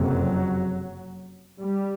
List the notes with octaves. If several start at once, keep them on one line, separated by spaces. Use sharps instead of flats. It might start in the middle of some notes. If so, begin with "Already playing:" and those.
Already playing: F#1 F2 C3 F#3
G3